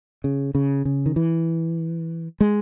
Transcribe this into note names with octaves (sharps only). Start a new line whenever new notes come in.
C#3
C#3
C#3
D#3
E3
G#3